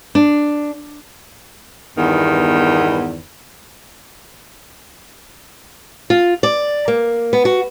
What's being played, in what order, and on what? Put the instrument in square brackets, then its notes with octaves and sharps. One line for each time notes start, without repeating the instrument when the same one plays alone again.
[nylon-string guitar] D4
[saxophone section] E2 G2 D#3 B3
[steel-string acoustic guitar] F4
D5
A#3
B3
F#4